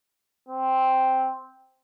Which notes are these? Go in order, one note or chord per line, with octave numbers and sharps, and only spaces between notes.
C4